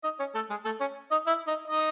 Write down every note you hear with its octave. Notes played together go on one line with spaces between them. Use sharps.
D#4 D#5
C#4 C#5
A3 A4
G#3 G#4
A3 A4
C#4 C#5
D#4 D#5
E4 E5
D#4 D#5
D#4 D#5